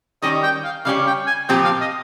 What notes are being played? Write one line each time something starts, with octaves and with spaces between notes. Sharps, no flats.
D#3 G3 C#4 G4 D#5
G5
F5
C#3 G3 C#4 G4 F5
G5
G#5
A#2 F3 C4 G4 G5
F5
D#5